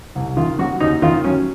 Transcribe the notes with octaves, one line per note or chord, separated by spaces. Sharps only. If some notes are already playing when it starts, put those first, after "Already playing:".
C2
D#3 F4
F#3 F#4
D#2 D#4
D#3 F4
F#3 C#4